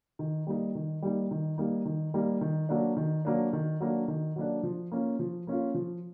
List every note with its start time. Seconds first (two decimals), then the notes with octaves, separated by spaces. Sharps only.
0.19 D#3
0.47 G3 A#3 D#4
0.75 D#3
1.02 G3 A#3 D#4
1.31 D#3
1.58 G3 A#3 D#4
1.85 D#3
2.14 G3 A#3 D#4
2.41 D#3
2.69 F#3 A#3 D4
2.97 D#3
3.25 F#3 A#3 D4
3.53 D#3
3.80 F#3 A#3 D4
4.08 D#3
4.36 F#3 A#3 D4
4.63 F3
4.92 A#3 C#4 F4
5.19 F3
5.47 A#3 C#4 F4
5.75 F3